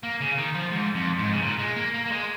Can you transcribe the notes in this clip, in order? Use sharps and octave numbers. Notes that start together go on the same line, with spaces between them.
A#3
C#3
D#3
F3
G#2
F2
G#2
C#3
A#2
G#3
A#3
A#3
A#3
G#3